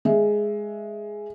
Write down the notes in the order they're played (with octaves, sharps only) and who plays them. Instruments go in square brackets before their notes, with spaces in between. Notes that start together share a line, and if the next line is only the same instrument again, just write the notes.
[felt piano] G#3 E5